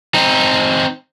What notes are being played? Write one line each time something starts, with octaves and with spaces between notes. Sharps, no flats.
C4 D#4